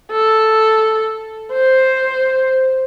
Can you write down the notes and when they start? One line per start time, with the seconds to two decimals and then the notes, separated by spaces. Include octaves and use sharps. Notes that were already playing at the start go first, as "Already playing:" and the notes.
0.12 A4
1.53 C5